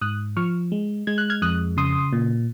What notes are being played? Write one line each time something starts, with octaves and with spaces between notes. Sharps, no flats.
G#2 D#6 F#6
F3 C#6 F6
G#3
G#3 G#6
F#6
F6 G#6
F2 D#6 F#6
C#3 C6 D#6
A#2